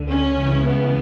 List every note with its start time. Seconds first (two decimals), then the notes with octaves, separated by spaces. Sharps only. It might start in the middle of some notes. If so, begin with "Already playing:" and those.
Already playing: D2 D3
0.09 C#4
0.36 C#2 C#3 E3
0.65 B3